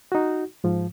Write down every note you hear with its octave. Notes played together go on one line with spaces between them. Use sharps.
D#4 F#4
G#2 F3